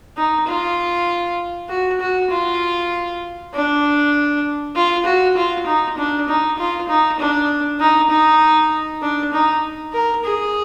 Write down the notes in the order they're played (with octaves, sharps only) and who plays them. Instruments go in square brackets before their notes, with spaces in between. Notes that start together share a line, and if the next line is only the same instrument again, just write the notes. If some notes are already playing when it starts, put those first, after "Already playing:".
[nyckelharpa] D#4
F4
F#4
F#4
F4
D4
F4
F#4
F4
D#4
D4
D#4
F4
D#4
D4
D#4
D#4
D4
D#4
A#4
G#4